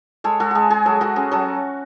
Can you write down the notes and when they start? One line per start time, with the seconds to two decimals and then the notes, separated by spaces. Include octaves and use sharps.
0.24 G#3 A4 C#5
0.40 G#3 F#4 A4
0.51 G#3 F#4 G#4
0.70 G#3 G#4
0.86 F#3 F#4 A4
1.01 F#3 F#4 A4
1.16 C#4 G#4
1.31 F#3 F#4 A4